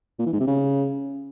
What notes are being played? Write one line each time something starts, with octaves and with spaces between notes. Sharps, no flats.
A#2
E3
G#2
C3
C#3